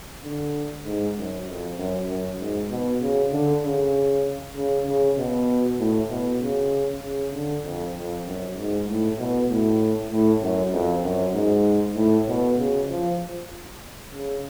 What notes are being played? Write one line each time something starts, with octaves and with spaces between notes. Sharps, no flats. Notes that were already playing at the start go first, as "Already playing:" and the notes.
D3
G#2
F#2
F2
F#2
F#2
G#2
B2
C#3
D3
C#3
C#3
C#3
B2
A2
B2
C#3
C#3
D3
F2
F2
F#2
G#2
A2
B2
A2
A2
F#2
F2
F#2
G#2
A2
B2
C#3
F3
C#3